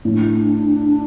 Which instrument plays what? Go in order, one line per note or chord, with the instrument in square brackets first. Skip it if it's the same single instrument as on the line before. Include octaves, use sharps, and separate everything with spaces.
[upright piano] A2 [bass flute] D4